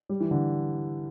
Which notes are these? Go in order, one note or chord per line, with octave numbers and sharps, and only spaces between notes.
G3
E3
D3